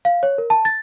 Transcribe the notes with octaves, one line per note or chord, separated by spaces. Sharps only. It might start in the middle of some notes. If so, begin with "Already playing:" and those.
F5
C#5
A#4
A5
A6